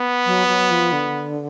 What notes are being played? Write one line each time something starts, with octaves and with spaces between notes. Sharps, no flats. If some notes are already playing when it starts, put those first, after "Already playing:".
Already playing: B3
F#3
F#3
F3
D3